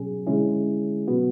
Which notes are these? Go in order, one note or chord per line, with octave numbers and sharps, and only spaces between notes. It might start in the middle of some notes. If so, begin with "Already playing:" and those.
Already playing: B2 F#3 C#4 G#4
D3 G#3 C#4 E4 G#4
B2 F#3 B3 F#4